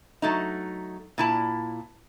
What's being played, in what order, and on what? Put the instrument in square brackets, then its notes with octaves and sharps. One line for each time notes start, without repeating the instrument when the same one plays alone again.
[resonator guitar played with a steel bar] F#3 A3 D#4
A#2 E4 A5